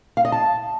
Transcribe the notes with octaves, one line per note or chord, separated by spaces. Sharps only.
F5
D#5
A5